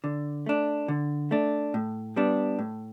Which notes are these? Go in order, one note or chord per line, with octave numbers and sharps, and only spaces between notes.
D3
A3 D4
D3
A3 D4
A2
G3 B3 D4
A2